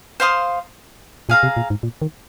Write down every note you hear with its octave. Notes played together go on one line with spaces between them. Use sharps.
C5 F5 C6 D#6
A#2 G#4 F5 A#5
C3
A#2
G#2
A#2
D#3